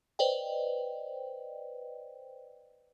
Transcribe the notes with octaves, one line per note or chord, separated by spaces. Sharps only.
B4 C5 D5 D#5 G5